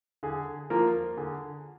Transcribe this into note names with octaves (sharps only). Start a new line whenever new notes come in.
D3 G#4
F3 A#3 F4 A#4
D3 G#4